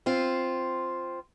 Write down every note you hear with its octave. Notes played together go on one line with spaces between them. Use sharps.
C4 F4